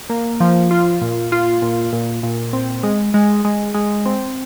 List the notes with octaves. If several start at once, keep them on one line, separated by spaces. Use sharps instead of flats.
A#3
F3
F4
A#2
F4
A#2
A#2
A#2
C4
G#3
G#3
G#3
G#3
C4